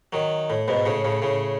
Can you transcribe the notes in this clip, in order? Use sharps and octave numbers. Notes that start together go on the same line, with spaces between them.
D#3 F#3
A2
G#2 B2
A2 C#3
A2 C#3
A2 C#3